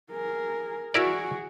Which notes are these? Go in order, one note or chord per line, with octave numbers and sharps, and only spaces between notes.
G#4 A#4
E4 F#4 G#4 A#4 D5